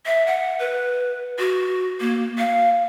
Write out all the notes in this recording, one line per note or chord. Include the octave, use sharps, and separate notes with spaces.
E5
F#5
B4
F#4
A#3
F5